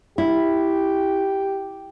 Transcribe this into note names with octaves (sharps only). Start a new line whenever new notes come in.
E4 G4